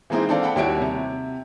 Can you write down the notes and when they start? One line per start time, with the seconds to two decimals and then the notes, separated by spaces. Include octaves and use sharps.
0.10 E3 G#3 A#3 C4 D#4 E4
0.29 C4 D4 A4 D5 F5
0.43 F#5 G5 B5
0.56 D#2 G3 E4 F#4 C#5 D7
0.81 C3